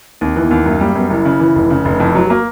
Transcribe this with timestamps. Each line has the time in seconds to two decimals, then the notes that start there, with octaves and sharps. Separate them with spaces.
0.21 D#2 C4
0.36 E3
0.43 B3
0.51 D#2
0.66 F#2 A#3
0.81 G3 A#3
0.95 F#2 B3
1.10 F#1 E4
1.25 C#3
1.40 E3
1.55 F1
1.70 C#3
1.85 F1
2.00 F2 E4
2.15 F#3 E4
2.25 G4
2.30 A#3 F#4